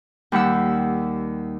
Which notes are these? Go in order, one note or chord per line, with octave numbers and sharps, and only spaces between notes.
D#2 G3 F#5 E6